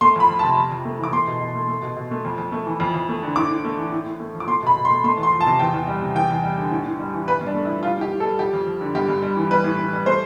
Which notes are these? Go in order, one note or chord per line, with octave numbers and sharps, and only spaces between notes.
A3 C6
F2 B5
F3
C3 A5
F2
F2
A3
E3 D6
A3 C6
B2
B2
A3
A3
B2
B2
A3
F2
F2
A3
E3
F2
F2
A3
D3
A2 D6
A2
A3
E3
A2
A2
A3
F3
D6
A3 C6
B2 B5
B2
C6
A3
A3 C6
E2
C6
F3
A5
C3
E2 G5
E2
G3
C3
E2 G5
E2
G3
D3
A2
A2
G3
E3
G2 B4
G2
D4
A3
E4
F3
G3 F4
A2 G4
A2
A4
G3
F2 G4
F2
F3
D3
G2 G4
G2
G3
E3
G3 B4
A2
A2
G3
A3 C5